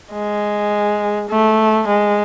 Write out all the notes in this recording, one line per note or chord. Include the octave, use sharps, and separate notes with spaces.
G#3
A3
G#3